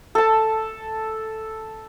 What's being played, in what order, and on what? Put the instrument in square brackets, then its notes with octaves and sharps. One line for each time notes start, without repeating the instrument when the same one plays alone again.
[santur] A4 A5